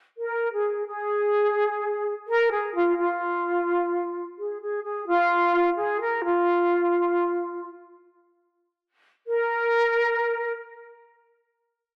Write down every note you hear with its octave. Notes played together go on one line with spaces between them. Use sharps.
A#4
G#4
G#4
A#4
G#4
F4
F4
G#4
G#4
G#4
F4
G#4
A#4
F4
A#4